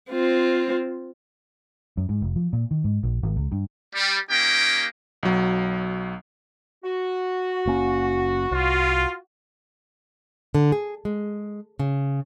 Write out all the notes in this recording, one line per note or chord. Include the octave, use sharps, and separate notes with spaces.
C4 F4
F#2
G#2
F1
F3
A#2
D#3
G#2
A#1
G#1
C#2
G2
G3
A#3 C#4 D#4 G4 G5
B1 F#3
F#4
F#1 A#3 C#4
C2 F4
D3
G#4
G#3
C#3